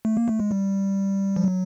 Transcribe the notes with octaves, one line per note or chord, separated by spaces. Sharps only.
A3
A#3
A3
G#3
G3
F3
F#3